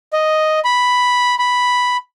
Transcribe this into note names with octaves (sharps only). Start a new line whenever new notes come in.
D#5
B5
B5